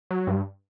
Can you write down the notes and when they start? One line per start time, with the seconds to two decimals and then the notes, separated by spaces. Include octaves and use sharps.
0.11 F#3
0.27 G2